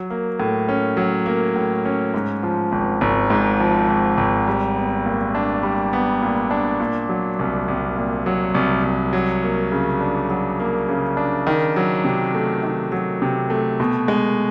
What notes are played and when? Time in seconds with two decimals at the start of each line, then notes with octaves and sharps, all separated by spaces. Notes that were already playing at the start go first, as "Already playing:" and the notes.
Already playing: F#3
0.10 A#3
0.40 A2
0.69 C#4
0.97 F#3
1.26 A#3
1.56 A2
1.85 C#4
2.14 G#2
2.43 F3
2.72 G#1
3.01 G#1
3.30 G#2
3.60 F3
3.88 G#1
4.17 G#1
4.48 G3
4.76 B3
5.05 A#2
5.35 D4
5.63 G3
5.93 B3
6.22 A#2
6.51 D4
6.80 A#2
7.09 F#3
7.39 C2
7.68 C2
7.96 A#2
8.26 F#3
8.54 C2
8.84 C2
9.13 F#3
9.43 A#3
9.72 C#3
10.01 D4
10.30 F#3
10.60 A#3
10.89 C#3
11.17 D4
11.47 D#3
11.76 F#3
12.04 C3
12.34 A3
12.63 D#3
12.92 F#3
13.22 C3
13.50 A3
13.80 B2
14.08 G#3